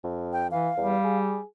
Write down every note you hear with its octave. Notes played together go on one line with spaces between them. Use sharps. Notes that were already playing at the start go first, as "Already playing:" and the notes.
F2
G5
E3 F5
E2 G3
G#4